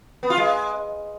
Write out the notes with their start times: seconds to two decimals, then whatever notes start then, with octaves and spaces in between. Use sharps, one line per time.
0.23 B3
0.30 F4
0.37 G#3